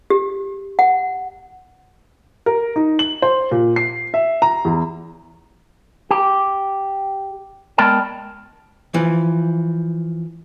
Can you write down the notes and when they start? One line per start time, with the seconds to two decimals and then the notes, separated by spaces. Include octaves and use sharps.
0.10 G4
0.79 F#5
2.46 A#4
2.76 D#4
2.99 F#7
3.22 C5
3.51 A#2
3.76 C7
4.14 E5
4.42 A#5
4.65 E2
6.11 G4
7.78 G#3 B3 A#4 D5 G5 A5
8.94 E3 F3